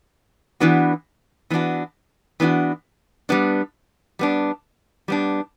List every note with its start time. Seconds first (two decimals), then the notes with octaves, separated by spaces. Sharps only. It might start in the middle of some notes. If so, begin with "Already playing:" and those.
0.60 E3 B3 D4 F#4
1.50 E3 B3 D4 F#4
2.40 E3 B3 D4 F#4
3.29 G3 B3 D4
4.19 G3 B3 D4
5.08 G3 B3 D4